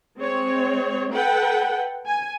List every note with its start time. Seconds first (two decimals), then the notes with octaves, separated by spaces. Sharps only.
0.18 G#3 C4 C#5
1.12 A4 B4 F#5 G5
2.07 G#5